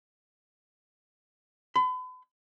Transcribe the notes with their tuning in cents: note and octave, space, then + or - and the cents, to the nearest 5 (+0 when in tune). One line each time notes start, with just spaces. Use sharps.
B5 +40